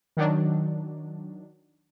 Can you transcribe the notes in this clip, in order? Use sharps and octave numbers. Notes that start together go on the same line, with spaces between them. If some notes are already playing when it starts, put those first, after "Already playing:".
D#3 F#3 D4